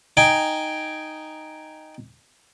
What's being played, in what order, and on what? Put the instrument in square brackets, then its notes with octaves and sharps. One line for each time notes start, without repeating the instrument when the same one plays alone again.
[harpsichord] D#4 G5 G#5